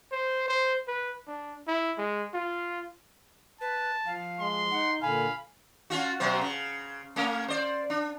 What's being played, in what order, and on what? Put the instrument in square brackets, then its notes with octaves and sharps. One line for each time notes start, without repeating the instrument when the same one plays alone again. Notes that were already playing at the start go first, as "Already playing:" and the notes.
[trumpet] C5
C5
B4
D4
E4
G#3
F4
[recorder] B4 [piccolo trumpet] A5
[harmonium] F3 [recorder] F5
[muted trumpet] G#3 [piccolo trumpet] C6
[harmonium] D#4 [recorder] F#5
[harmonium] A#2 D3 [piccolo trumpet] F5 [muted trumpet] G#5 [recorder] B5
[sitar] C#4 F4 F#4
B2 F#3 C5
C#3
A3 A#3 C#4
C5 D5
D4